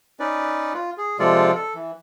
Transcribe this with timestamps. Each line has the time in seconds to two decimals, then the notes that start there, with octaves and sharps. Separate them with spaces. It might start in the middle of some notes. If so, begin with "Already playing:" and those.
0.20 C#4 D#4 B4 D5
0.73 F4
0.98 G#4
1.19 C3 F3 G#3 F4 A4 D5
1.54 A4
1.74 E3